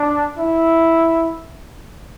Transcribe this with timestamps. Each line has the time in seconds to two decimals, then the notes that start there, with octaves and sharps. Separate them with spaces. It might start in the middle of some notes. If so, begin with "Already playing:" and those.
Already playing: D4
0.38 E4